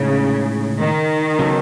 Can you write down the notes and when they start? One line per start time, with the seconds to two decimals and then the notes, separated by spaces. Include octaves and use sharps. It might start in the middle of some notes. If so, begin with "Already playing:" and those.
Already playing: A2 C#3 G#3 D#4
0.79 D#3
1.39 C#3 F#3 B3 D#4 A4